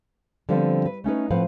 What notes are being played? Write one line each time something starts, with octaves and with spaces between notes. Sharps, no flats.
D3 F3 G3 B3 C4
B4
A3 C#4 D#4 B4
A2 F3 C4 B4 F5 F#5